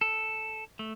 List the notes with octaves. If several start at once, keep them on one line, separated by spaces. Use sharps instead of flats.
A4
A3